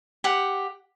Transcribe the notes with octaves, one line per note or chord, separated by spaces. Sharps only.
G4 F#5